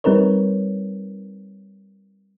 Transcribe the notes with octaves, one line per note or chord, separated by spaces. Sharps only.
G3 C4 D#4 A#4 B4 C#5